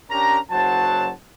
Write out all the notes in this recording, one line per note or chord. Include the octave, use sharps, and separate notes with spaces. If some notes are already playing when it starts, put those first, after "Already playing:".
C#4 D4 G4 A#4 C#5 A#5
F#1 F#3 C5 F#5 A5